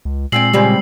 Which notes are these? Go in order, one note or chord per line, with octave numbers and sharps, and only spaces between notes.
C#2
A#2 G#3 C4 D5 E6 C7 F#7
C#3 G3 G#3 C4